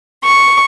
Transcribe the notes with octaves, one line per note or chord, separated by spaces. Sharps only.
C#6